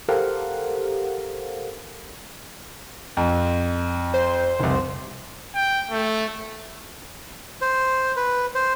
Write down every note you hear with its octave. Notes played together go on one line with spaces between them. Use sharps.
G4 A4 A#4 C5 F5 F#5
F2
C5
F1 C2
G5
A3
C5
B4
C5